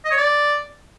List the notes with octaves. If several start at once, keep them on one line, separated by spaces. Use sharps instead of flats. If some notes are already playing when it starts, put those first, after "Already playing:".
D#5
C#5
D5